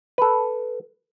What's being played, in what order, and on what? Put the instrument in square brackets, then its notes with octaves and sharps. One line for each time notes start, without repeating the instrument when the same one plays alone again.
[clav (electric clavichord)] A4 B4